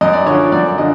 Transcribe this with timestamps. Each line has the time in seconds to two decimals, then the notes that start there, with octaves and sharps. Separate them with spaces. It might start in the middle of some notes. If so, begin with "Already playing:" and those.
0.01 F#2 D#5
0.13 D5
0.26 D3 F3 C#5
0.52 F#2 D5
0.78 D3 F3 D#5